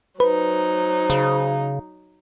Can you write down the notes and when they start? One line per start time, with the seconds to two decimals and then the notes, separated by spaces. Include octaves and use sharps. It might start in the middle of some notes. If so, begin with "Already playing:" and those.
0.20 F#3 D#4 B4 C5
1.10 C#3